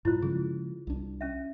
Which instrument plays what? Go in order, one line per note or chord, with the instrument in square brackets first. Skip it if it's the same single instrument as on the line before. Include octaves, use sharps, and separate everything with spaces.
[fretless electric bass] G2 A#2 [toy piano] E4 F4 C5
[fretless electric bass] C#3 F3 G#3 [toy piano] G#4
[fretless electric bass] C2 D4
[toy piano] C#4 E5